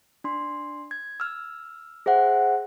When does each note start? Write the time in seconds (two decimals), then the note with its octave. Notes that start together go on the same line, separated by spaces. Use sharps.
0.24 D4 C6
0.91 G#6
1.20 E6 F6
2.06 G#4 C5 E5 F#5